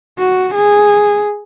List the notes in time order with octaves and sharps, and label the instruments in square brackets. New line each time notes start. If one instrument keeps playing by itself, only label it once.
[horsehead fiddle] F#4
G#4